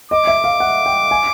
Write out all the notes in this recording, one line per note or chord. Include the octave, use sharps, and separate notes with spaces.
D#5 D6
E5
F5
F#5
G5
G#5